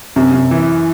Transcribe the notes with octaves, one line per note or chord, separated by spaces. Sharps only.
F#2 C3
F#2
E3